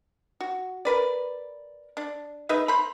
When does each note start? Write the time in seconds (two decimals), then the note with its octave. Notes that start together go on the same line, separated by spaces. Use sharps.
0.41 F#4
0.85 A#4 B4 D5
1.97 D4
2.49 G#3 D#4 B4 E5
2.68 C5 A#5 B5